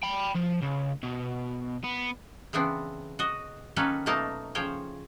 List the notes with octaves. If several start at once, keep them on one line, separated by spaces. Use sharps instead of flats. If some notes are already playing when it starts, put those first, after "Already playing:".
G5 B5
F3
C#2
B2
B3
C#3 E3 B3 C4 D4
F#4 D#5
D#3 F#3 A#3 C#4 A4 B4
B2 F#3 A3 A#3 D#4 A5
C#3 F3 C5 C#5 G5